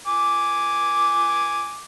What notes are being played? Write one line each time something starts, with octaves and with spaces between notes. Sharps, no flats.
G#5 D6